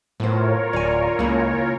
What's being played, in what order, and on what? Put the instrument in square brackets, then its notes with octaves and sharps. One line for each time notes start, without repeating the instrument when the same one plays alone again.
[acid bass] A2 [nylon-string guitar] B3 C5 [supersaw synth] F4 A#4 C#5
[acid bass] D1 [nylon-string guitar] D5 G#5
[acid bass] C#2 [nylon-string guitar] C#3 A#3 E4